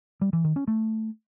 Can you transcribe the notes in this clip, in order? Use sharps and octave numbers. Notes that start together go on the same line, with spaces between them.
G3
E3
D#3
C#4
A3